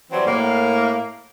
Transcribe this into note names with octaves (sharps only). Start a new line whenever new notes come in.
E3 F#3 G3 C4
A2 A#3